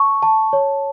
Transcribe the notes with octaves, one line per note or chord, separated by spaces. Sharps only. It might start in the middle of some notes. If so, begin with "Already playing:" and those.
Already playing: A5 C#6
A5
C#5